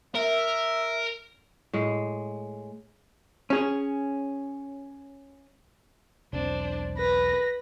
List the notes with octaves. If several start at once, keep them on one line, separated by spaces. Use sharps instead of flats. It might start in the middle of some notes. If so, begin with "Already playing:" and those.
A#4 E5
A2 G#3
C#4 G#4
B1 E2 C4 D4 C5
B4 A#6